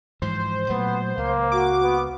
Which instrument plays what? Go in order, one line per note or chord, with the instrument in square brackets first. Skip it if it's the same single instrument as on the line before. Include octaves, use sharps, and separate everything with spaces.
[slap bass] G#2 E3 F3 [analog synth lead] C5
[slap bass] A#2 F#3 A3 [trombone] B3
[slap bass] C#2 [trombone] A#3
[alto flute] F#4 [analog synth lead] D6
[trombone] B3